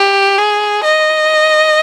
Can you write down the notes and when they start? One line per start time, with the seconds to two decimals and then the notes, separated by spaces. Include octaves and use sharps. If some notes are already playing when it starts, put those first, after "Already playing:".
Already playing: G4
0.38 G#4
0.84 D#5